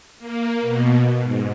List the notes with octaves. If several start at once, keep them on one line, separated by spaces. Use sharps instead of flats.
A#3
B2
G#2